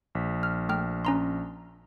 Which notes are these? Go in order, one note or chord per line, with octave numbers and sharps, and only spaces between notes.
A#1 B6
F6
A3 G5 F6
C#4 A#5 C6